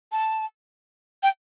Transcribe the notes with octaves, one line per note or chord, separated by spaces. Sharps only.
A5
G5